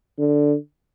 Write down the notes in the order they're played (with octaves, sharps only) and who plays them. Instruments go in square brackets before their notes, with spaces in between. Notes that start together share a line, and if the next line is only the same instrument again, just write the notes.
[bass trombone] D3